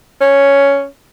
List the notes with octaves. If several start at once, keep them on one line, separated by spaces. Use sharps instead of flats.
C#4